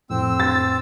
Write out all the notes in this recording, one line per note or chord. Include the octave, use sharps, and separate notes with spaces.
F2 A2 C4 E6
A6